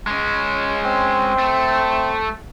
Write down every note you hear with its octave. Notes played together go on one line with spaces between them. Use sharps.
G#3 C#4
C4
A3